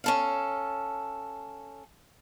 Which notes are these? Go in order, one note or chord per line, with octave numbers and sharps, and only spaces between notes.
C#4 A4 F5